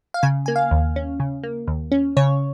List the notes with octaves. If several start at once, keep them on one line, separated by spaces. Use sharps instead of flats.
F5
C#3 G#5
A#3 G#5
F5
D#2
C#4
C#3
A#3
D#2
C#4
C#3 C#5